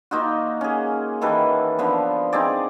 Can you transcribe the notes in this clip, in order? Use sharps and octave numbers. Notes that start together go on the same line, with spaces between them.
A#3 D#4 F4 F#4
C#4 G#4
D#3 E3 A4 B4
D3 F3 B3
C4 D#4 G#4 D5